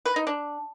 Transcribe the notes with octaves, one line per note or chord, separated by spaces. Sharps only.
B4
D#4
D4